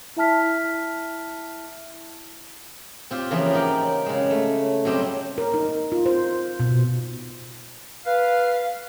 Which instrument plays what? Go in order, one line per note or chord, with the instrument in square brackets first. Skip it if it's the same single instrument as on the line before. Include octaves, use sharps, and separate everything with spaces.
[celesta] E4 E5 A5 F6 B6
[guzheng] C4 F4 G4
C#3 E3 F3 A#3 B3
D#4 G4 A#4 D5 G5
C#3 G#3
A3
F#3 G3 C4 G4 D#5
[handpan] A#4
D#4
F4
C5
B2
[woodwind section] B4 F5